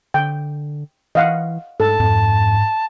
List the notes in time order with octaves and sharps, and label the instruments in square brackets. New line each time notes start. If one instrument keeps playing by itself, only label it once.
[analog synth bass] D3 [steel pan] G5
[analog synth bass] E3 [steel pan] D#5 F5 F#5
[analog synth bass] G#2 [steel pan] A4 [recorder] A5
[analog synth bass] F2 [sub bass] G#2